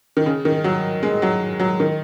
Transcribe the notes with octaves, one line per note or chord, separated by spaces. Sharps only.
D#3
C#3
D#3
F#3
G#3
F#3
F#3
D#3